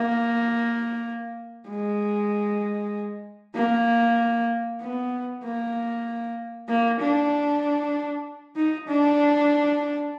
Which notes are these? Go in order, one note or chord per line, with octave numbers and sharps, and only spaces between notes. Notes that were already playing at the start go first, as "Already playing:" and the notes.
Already playing: A#3
G#3
A#3
B3
A#3
A#3
D4
D#4
D4